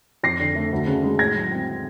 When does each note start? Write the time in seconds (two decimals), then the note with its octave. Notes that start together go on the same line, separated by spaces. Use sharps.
0.23 F2 A#6 C7
0.40 D3
0.55 A3
0.72 D2
0.87 C#3
1.03 G#3
1.19 A2 G#6 A#6
1.35 F#3
1.51 C4